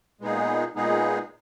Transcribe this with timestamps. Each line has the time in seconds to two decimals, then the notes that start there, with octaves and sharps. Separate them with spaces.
0.21 A#2 G#3 B3 D#4 G#4
0.75 A#2 G#3 B3 D#4 G#4